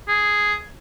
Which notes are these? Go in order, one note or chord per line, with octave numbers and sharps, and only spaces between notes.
G#4